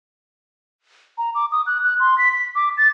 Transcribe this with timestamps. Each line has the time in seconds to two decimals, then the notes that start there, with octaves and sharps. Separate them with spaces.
1.18 A#5
1.35 D6
1.52 D#6
1.67 F#6
1.84 F#6
2.00 C6
2.18 B6
2.33 B6
2.55 D6
2.77 A6